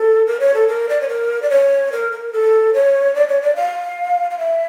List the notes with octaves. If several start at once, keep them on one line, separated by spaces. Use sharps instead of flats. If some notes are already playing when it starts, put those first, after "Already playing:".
Already playing: A4
A#4
C#5
A4
A#4
D5
C#5
A#4
D5
C#5
A#4
A#4
A4
C#5
D5
C#5
D5
F5
F5
E5